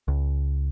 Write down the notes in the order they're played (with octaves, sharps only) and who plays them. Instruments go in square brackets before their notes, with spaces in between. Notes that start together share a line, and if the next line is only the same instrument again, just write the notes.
[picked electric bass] C#2